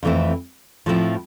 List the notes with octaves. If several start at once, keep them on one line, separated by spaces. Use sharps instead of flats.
F2 E3 A3 C4 E4
A2 F3 C4 E4